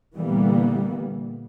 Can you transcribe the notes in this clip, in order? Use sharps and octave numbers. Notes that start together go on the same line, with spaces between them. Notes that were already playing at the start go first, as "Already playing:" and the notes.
A#2 D3 E3 G3 A#3 B3